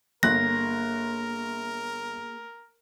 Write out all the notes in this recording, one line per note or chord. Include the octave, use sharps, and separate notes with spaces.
G1 A#3 G#4 A#4 D#5 F#6 A#6